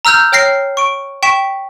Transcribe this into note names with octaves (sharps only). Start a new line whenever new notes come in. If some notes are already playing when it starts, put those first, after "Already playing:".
A#5 E6 F6 G6
C#5 G5 F6 A#6 C7
C#6 D7
G5 C#6 B6 E7